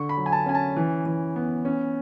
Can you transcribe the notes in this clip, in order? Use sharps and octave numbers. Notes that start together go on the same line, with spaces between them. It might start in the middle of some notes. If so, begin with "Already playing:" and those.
Already playing: D3 C#6
B5
F#3
G#5
A5
C#4 G#5
A5
E3
E3
B3
C#4